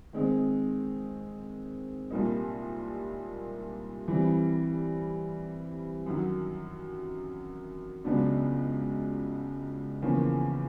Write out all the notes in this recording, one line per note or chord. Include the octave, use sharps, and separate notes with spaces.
D#3 G#3 C4 D#4
C2 A#2 G3 A#3 D#4
E3 G3 C4
F#2 D#3 F#3
C#2 C#3 F#3 B3 D4
E2 C#3 F3 A#3 C#4